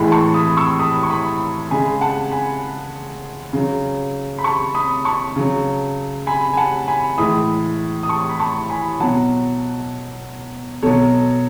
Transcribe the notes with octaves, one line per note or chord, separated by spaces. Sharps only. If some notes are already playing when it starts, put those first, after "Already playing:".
Already playing: A2 E3 G#3 G#5 B5
A5 C#6
B5 D#6
C#6 E6
B5 D#6
C#6
B5 D#6
C#3 G#3 G#5 B5
F#5 A5
G#5 B5
C#3 F#3
B5
A5 C#6
B5 D#6
A5 C#6
C#3 F#3
G#5 B5
G#5
F#5 A5
G#5 B5
A2 E3 G#3 B5 D#6
D#6
A5 C#6
B5
A5 C#6
G#5 B5
B2 F#3 F#5 A5
B2 F#3 A4 C#5